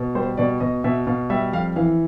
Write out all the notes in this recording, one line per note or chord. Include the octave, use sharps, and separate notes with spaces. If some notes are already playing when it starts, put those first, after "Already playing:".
Already playing: B2
G3 C5
B2 D5
B2 D#5
B2 E5
B2 F5
G3 E5
F2 F5
E3 F5